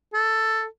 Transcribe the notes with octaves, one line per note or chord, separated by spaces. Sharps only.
A4